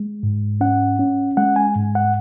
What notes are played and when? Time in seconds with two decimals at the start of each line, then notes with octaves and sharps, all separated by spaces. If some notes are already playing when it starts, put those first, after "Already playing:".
Already playing: G#3
0.23 G#2
0.61 C#4 F#5
0.99 C#4
1.37 G#3 F#5
1.56 G#5
1.76 G#2
1.95 F#5